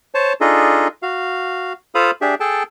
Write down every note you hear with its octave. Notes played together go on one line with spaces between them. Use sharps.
C5 C#5 A5
D4 D#4 F4 G#4 A4 D#5
F#4 F5
F4 A4 C5 F5 B5 D#6
D4 G4 G#4 E5
G#4 A4 G5 A5